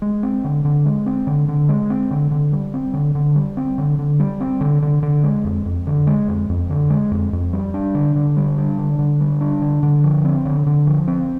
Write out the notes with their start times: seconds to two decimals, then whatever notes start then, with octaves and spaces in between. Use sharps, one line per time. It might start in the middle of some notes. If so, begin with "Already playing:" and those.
0.02 G#3
0.23 C4
0.44 D3
0.65 D3
0.86 G#3
1.06 C4
1.27 D3
1.48 D3
1.69 G#3
1.90 C4
2.11 D3
2.31 D3
2.52 G3
2.74 C4
2.94 D3
3.15 D3
3.36 G3
3.57 C4
3.78 D3
3.99 D3
4.20 G3
4.40 C4
4.61 D3
4.82 D3
5.03 D3
5.24 G#3
5.45 F2
5.66 F2
5.87 D3
6.07 G#3
6.28 F2
6.49 F2
6.70 D3
6.90 G#3
7.11 F2
7.33 F2
7.53 G3
7.74 D4
7.95 D3
8.16 D3
8.37 G3
8.58 D4
8.78 D3
8.99 D3
9.20 G3
9.41 D4
9.61 D3
9.83 D3
10.04 F3
10.25 C4
10.45 D3
10.66 D3
10.87 F3
11.08 C4